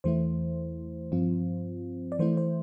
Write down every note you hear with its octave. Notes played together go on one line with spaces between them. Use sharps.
E2 E3 A3 E4 C5
G2 F3 C4 F4
D5
E3 A3 E4 C5
C5